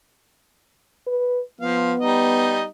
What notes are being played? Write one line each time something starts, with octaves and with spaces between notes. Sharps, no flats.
B4
F3 B3 F5
G3 D#4 D#5